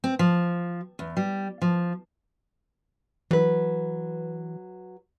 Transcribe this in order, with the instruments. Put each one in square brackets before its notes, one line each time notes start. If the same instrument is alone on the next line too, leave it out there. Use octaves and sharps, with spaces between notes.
[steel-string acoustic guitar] C4
F3
E2
G3
F3
[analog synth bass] E3 [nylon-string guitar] F#3 B4